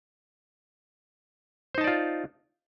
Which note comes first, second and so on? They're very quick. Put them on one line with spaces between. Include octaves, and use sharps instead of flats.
C5 D#4 A5 D5 F4